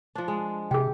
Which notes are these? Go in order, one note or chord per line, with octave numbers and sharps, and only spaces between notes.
F3 D4
G#3
C3 G4 G#4 G5